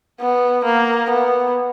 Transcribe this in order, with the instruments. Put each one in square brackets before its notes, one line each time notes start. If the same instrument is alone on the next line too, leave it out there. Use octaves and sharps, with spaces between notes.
[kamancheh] B3
A#3
B3